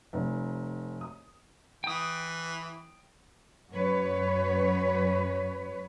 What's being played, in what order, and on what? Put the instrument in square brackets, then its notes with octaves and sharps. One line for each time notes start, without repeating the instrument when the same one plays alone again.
[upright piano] F1
D#6
[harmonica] E3 [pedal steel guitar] G5 D#6
[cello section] F#2 B4 C#5